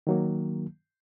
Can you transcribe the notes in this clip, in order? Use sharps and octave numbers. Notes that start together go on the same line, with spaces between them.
D#3 F#3 A#3